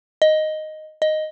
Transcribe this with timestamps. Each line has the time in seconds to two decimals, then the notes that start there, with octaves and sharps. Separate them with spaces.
0.22 D#5
1.02 D#5